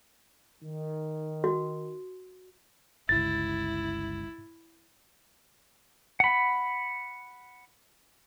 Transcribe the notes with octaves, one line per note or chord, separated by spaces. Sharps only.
D#3
F#4
G1 C#2 E4 A6
F#5 B5